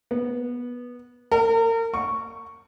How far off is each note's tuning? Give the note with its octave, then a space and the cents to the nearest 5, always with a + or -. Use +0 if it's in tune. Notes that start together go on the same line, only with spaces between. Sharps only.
B3 -15
A#4 -35
C#6 +0